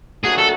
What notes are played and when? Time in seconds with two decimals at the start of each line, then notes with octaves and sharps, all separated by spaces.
0.24 A#2 F#3 A3 D4 F#4 G#4
0.38 A4